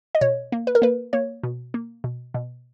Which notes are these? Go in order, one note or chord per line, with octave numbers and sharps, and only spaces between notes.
D#5
B2 C#5
A#3
B4
A#4
A#3 B4
A#3 C#5
B2
A#3
B2
B2